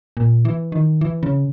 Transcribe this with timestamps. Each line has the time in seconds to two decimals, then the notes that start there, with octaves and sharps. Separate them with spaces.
0.17 A#2
0.45 E3
0.72 D#3
1.01 E3
1.23 C#3